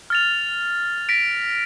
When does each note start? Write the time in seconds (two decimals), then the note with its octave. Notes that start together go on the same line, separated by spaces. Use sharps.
0.10 F6 A6 F7
1.09 A#6 B6 D7